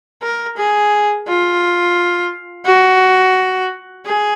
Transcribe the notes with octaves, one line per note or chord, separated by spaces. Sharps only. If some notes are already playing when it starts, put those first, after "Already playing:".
A#4
G#4
F4
F#4
G#4